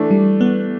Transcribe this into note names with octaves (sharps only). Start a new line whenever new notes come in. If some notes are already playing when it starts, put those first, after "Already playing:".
Already playing: E3 A3 D4
G3
B3